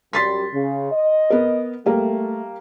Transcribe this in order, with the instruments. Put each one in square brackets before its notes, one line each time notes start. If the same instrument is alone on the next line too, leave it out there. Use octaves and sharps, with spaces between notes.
[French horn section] F#2 G3 [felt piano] C6 A6 B6
[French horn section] C#3
D#5
[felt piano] B3 A#4
[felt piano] G3 A#3 [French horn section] A3